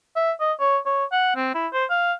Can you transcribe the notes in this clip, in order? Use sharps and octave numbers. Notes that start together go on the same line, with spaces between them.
E5
D#5
C#5
C#5
F#5
C4
E4
C5
F5